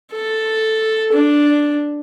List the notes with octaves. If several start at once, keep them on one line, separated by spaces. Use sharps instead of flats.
A4
D4